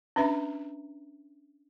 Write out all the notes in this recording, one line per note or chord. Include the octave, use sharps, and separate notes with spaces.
C#4 D4 B4 E5 A#5